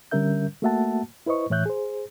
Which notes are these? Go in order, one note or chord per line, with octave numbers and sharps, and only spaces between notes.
D3 G3 C#4 A#4 E5 G6
A3 A#3 F#4 E5 F#5 A5
E4 B4 C5 D#5 C#6
A2 E3 C#5 E5 F#6 G6
G#4 C5